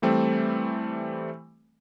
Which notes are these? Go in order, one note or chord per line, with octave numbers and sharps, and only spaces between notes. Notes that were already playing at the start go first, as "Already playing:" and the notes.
E3 G3 A3 C4